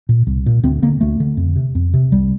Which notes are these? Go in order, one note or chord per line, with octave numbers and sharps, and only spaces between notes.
A#2
C2
A#2
D2 C4
D3 A#3
D2 A3
D3
F2
C3
F2
C3
C2 G3